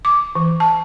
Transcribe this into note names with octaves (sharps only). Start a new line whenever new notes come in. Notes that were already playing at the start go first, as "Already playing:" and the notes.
D6
E3
A5